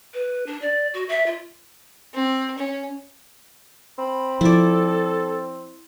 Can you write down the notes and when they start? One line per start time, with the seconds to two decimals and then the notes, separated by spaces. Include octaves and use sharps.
0.14 B4
0.46 D4
0.62 D5
0.94 F#4
1.09 E5
1.26 F4
2.14 C4
2.58 C#4
3.98 C4 B5
4.41 F3 E4 A4 D5